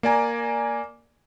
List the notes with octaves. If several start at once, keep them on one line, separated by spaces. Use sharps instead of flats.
A#3 D5 G#5 A#5